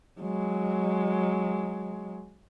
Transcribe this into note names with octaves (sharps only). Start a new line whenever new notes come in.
F#3 G#3